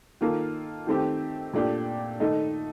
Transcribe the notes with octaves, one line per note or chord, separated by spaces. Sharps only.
D#3 A#3 F4 A4
D#3 A3 C4 G4
A#2 A3 D4 G4
D#3 A3 D#4 A4